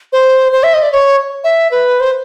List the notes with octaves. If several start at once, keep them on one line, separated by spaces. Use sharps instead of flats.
C5
C5
E5
D#5
D5
C#5
E5
B4
C5